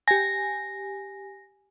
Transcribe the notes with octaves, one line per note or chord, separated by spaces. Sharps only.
G4 G#5 A#6